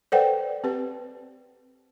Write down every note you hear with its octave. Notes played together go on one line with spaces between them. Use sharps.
A4 B4 C5 D5 F#5 G5
C4 G4 B4